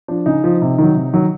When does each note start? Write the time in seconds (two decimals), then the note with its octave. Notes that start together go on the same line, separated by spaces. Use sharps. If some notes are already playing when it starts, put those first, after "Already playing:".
0.08 F3 D4
0.26 C#3 D#4
0.44 F3
0.62 C3
0.78 D#3 F#3
0.95 C3
1.13 D#3 F#3